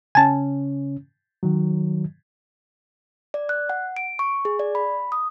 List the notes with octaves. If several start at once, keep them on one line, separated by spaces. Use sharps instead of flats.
C#3 C#4 G#5 A5
D#3 F#3
D5
F#6
F#5
D7
C#6
G#4
D5
B5
D#6